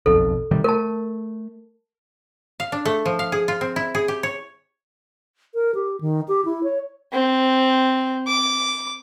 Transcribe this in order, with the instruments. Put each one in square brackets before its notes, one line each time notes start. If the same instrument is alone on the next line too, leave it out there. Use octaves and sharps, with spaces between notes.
[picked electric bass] F#1 B1 F2 [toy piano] A4
[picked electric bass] C3 D#3 G3
[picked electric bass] A3 [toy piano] A#4 A5
[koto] F5
D4
A3
F3
F5
G#4
F4
C4
E4
G#4
G4
C#5
[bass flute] A#4
G4
D#3
G4
E4
C#5
[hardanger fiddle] C4
D6